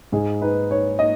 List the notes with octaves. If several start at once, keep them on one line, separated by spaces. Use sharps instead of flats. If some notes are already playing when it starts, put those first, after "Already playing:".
G#2 G#4
D#4 B4
D#4 C#5
D#4 D#5